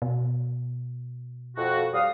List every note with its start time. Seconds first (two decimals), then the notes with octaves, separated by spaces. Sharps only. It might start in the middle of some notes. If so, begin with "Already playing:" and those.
0.02 B2
1.57 F2 F#4
1.94 G3 F5 D#6